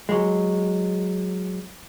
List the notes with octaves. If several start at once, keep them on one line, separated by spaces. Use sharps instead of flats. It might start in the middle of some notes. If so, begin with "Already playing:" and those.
F#3 G#3